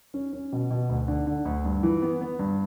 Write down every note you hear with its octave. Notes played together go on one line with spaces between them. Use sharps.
C#4
C#4
B2
B2
D2
D3
D3
D2
G2
E3
B3
B3
G2